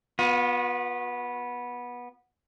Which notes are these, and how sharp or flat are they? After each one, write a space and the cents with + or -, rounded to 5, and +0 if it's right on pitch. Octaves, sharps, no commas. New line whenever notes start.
B3 -15 F4 +40